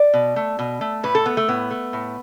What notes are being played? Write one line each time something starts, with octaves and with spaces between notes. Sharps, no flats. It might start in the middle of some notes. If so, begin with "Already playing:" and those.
Already playing: D5
B2
A3
B2
A3
A2 B4
A4
A3 B3
A3
A2 B3
A3
A2